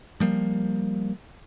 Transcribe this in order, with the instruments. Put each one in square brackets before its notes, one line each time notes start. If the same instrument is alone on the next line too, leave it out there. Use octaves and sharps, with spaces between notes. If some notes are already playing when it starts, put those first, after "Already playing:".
[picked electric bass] F3 G3 A#3